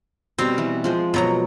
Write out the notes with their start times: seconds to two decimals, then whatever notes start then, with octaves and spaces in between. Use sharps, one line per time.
0.38 B2 G3 C4 A#5
0.58 E3
0.84 F3 G#3 C5
1.14 B2 F#3 A#5